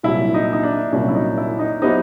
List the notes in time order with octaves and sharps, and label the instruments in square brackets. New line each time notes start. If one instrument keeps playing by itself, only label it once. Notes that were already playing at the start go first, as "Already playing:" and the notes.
[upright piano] C2 A#2 F#3 [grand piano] E4
[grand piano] D#4
D#4
D4
[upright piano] C2 A#2 F#3 [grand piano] C#4
[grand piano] E4
D#4
E4
D#4
[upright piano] F#3 B3 E4 G4 C5 [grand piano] D#4